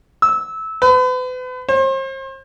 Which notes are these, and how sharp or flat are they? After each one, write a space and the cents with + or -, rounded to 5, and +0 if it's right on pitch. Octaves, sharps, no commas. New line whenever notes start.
E6 -20
B4 +40
C5 +40